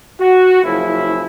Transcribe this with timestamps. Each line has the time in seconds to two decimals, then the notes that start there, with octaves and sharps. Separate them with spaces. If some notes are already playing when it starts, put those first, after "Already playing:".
0.19 F#4
0.63 F#1 C#3 F3 E4